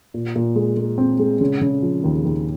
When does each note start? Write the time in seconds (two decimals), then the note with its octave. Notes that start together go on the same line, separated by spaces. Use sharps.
0.14 A#2
0.35 A#2
0.56 G#3
0.77 G#3
0.98 C4
1.19 G#3
1.41 C#3
1.61 C#3
1.82 F3
2.04 D#2
2.25 D#2